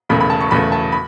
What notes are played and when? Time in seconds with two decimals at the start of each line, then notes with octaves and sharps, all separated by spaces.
0.09 E1 E2 C#3 A3 B5
0.20 B5
0.30 A5
0.41 C#6
0.51 E1 E2 C#3 A3 B5
0.72 A5
0.92 B5